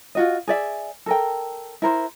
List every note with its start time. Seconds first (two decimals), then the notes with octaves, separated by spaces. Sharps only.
0.15 F4 F#4 D#5
0.48 G#4 D5 E5
1.06 A4 A#4 G5
1.82 E4 A#4 C5